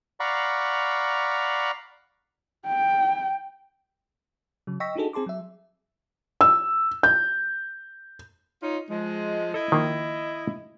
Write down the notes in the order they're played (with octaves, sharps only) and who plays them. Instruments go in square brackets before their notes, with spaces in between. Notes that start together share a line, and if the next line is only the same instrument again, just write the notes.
[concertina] D5 F5 F#5 A#5 B5 C#6
[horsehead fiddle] G5
[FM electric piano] C#3 F#3
D#5 G5 C#6 E6 A#6 B6
D4 D#4 F#4 G#4 A4
C4 G#4 A5 C6 D6
F#3 E5
[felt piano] E6
G6
[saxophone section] D#4 F4 C#5
F3 G#3
[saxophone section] E4 D#5 [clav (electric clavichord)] A4
[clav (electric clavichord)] D#3 F3 A#3